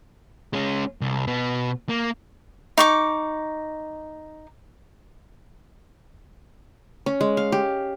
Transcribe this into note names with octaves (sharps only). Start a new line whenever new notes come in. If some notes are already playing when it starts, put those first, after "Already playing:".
G#3 C#4
C2
B2 B3
A#3
D#4 C#6 D6
C#4
G#3
F5
G4